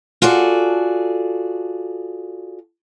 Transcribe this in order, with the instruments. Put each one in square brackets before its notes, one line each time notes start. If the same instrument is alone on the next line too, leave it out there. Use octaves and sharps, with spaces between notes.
[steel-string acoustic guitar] F4 F#4 G#4 A4 D5